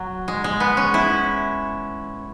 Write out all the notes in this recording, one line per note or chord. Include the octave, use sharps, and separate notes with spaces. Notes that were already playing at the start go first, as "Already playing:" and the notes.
Already playing: F#3
G#3
G#3
B3
C#4
E4